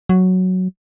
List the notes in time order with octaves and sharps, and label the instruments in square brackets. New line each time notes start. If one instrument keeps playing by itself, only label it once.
[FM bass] F#3